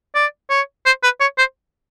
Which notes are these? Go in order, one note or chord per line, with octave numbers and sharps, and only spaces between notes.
D5
C#5
C5
B4
C#5
C5